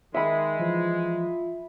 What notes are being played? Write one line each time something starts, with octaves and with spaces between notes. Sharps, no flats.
D#3 G#3 E5 B5
E3 F3 F4